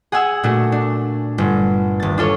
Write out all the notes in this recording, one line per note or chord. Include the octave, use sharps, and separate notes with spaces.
G#4 F#5 G#5 E6
A#2 A3 D4 F#4
D4
G1
D#1 A6
D4 F4 A4 C#5